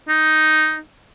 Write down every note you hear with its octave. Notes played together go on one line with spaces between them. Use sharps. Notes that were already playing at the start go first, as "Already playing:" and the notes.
D#4